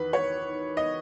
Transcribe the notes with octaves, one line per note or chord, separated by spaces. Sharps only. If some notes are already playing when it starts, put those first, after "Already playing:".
Already playing: E2 D#3 B4
C#5
D#5